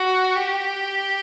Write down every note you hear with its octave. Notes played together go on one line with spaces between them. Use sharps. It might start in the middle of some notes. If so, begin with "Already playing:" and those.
Already playing: F#4
G4